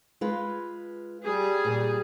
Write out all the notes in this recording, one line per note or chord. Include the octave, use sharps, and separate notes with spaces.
G#3 F4 B4
G3 G#4
A#2